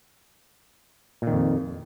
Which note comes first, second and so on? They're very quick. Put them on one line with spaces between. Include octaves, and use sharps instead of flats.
A#2 D#3 F2